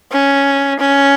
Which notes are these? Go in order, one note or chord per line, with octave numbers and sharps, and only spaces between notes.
C#4
C#4